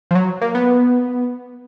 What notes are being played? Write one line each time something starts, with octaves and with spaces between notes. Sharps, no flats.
F3
F#3
A#3
B3